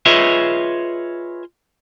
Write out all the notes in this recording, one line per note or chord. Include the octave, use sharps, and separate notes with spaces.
F4 G#4 B4 C#5 D#5 E5